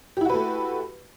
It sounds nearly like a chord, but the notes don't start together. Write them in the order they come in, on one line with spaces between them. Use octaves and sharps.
G4 E4 F#4 B4 A3